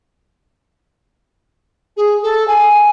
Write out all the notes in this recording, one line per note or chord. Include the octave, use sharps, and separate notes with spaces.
G#4
A4
G#5